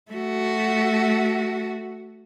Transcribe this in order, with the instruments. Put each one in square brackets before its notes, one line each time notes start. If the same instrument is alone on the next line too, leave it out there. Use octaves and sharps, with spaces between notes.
[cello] A3 F#4